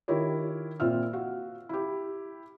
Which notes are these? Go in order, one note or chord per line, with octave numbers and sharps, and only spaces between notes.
D#3 E4 F4 G4 A#4 C#5
A#2 C4 F4 E5 E6 F6
F#4 F5
E4 G4